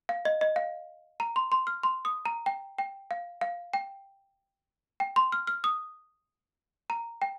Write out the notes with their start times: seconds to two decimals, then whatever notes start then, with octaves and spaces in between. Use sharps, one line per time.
0.09 F5
0.25 D#5
0.41 D#5
0.56 F5
1.20 A#5
1.36 C6
1.52 C6
1.67 F6
1.83 C6
2.05 D#6
2.25 A#5
2.46 G5
2.78 G5
3.11 F5
3.41 F5
3.74 G5
5.00 G5
5.16 C6
5.32 F6
5.47 F6
5.64 D#6
6.90 A#5
7.22 G5